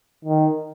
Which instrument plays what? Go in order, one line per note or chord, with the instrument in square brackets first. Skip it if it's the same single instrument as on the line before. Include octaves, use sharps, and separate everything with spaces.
[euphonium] D#3